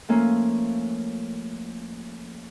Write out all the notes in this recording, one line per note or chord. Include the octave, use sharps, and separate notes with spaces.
F3 A3 A#3 C#4